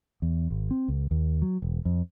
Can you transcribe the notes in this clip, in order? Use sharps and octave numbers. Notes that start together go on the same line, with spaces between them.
E2
G#1
C4
C#2
D#2
F#3
E1
F2